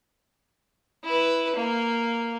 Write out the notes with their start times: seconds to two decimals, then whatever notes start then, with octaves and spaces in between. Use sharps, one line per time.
1.04 E4 B4
1.55 A#3